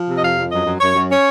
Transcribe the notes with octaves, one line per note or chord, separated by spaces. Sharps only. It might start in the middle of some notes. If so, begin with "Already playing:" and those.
Already playing: F3
C3
D#5
F2 F5
F2
F#2 D#5
F#2
F#2 C#5
F#2
C#4 C#5